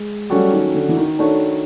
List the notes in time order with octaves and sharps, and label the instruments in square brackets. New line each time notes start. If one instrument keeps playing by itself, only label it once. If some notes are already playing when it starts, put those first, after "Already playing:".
Already playing: [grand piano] G#3
[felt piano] F#3 A3 C#4 F#4 A4 [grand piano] G3
[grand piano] D#3
D3
E3
D#3
[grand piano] D#3 [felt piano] A3 D4 F#4 A4 C#5